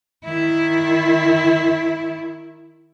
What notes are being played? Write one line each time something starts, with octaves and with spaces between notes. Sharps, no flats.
D#3 E4